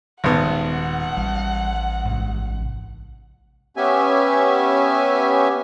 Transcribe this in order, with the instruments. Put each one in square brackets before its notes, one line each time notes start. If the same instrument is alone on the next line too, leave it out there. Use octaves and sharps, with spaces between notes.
[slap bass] D#1 [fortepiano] G#1 B3 [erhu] F#5
[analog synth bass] A1 [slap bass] G3
[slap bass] C2 G#2
[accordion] B3 C#4 G4 E5 G#5